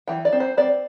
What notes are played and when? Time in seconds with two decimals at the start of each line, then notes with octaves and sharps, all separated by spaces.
0.08 E3 G5
0.25 D5
0.32 C4
0.40 C5
0.57 C4 D5